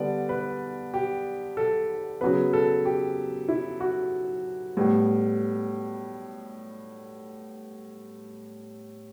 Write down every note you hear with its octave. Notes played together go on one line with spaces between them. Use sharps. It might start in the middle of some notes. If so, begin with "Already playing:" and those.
Already playing: D3 G3 B3 D5
B4
G4
A4
C#3 F#3 B3 B4
A4
G4
E4
F#4
A2 G3 B3